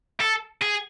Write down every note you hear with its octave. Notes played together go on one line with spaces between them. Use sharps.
A4
G#4